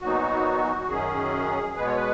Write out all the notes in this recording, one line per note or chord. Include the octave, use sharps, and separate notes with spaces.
A#2 F#3 B3 D#4 F#4
F#2 D#3 F#3 C#4 G#4
B2 G#3 B3 B4
C#5
B4